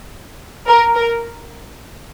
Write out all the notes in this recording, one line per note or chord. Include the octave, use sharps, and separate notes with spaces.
A#4
A#4